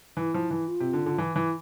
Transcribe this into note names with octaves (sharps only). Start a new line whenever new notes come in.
E3 E4
F3
E3
F4
C3
D3
D3
E3 E4
E3 E4